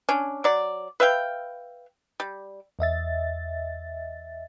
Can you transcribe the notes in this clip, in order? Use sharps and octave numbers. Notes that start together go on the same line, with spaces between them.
C#4 D4
F#3 D5
B4 E5 F5 G5
G3
E2 D#5 E5 A6